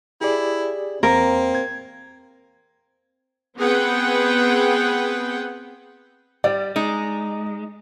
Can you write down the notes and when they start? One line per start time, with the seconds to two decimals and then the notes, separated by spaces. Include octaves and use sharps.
0.21 E4 G4 G#4 D5
1.03 E2 A#3 C4 A#4
1.55 G#6
3.57 B3 C4 G#4 B4 F#5 G5
6.44 G3 D5
6.76 G#3 D#4